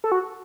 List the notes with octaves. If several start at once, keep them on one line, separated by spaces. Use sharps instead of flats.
A4
F#4